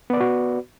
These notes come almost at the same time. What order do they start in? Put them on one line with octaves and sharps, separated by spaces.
B3 D5 B4 F#4